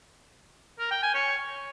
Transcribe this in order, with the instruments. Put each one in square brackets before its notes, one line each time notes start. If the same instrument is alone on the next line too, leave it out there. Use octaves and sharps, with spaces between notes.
[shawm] A#4
G5
G#5
C#5